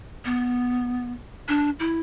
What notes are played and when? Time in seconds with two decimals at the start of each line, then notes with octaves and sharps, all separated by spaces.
0.25 B3
1.48 D4
1.79 E4